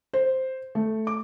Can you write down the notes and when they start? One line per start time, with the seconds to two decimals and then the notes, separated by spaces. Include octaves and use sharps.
0.13 C5
0.75 A3
1.07 D6